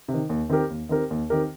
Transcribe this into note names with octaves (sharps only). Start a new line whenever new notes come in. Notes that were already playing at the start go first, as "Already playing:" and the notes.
C3
D#3
D#2
D#3 C4 G4 A#4
D#2
D#3 C4 G4 A#4
D#2
D#3 C4 G4 A#4